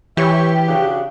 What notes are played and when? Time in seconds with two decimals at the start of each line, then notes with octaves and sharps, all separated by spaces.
0.17 E3 G4 C#5 E5
0.68 C#3 D4 F#4